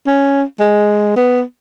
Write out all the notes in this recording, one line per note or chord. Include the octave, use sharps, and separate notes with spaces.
C#4
G#3
B3